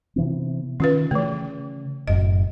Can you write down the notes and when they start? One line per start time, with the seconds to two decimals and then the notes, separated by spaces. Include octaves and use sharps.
0.16 C3 E3 B3
0.80 D#3 C#4 F4 B4
1.11 C#3 E3 A3
2.08 F#1 F#2 A2 D#5